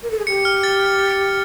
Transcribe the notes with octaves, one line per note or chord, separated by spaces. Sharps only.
A#4
A4
G#4
G4 C#7
F6
A6